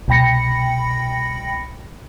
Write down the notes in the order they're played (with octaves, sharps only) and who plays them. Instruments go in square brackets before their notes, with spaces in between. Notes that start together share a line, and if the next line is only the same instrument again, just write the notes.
[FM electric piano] C2 B2 G5 B5 A#6 C#7